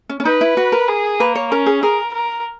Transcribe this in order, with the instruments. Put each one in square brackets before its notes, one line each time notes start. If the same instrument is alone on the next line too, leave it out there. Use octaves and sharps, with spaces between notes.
[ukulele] C#4
C#4
[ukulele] D#4 [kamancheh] B4
[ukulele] E4
F#4
A#4
[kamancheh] G#4
[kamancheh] A#3 [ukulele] B4
[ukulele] C#5
[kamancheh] C#4 [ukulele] A#4
[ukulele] G#4
[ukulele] G#4 [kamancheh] A#4
[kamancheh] A#4